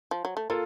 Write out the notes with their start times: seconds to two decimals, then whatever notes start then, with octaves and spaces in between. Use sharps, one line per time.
0.11 F3
0.25 F#3
0.37 A3
0.50 A#3 F4 A4